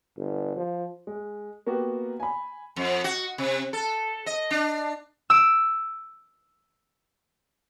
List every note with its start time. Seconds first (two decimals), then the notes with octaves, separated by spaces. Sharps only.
0.17 G1
0.56 F3
1.07 G#3
1.67 A#3 B3 F#4 G4
2.20 G#5 B5
2.76 F2
3.04 F#4
3.38 C3
3.73 A4
4.26 D#5
4.51 D4
5.30 E6 D7